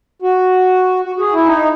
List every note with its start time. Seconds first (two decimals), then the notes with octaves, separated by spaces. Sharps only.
0.22 F#4
1.04 F#4
1.15 F#4
1.19 G#4
1.33 E4
1.46 D#4